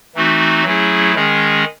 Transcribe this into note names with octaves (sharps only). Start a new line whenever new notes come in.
E3 A3 C4 D#4 F#4
F#3 A3 C#4 E4 G#4
D#3 G#3 C#4 G#4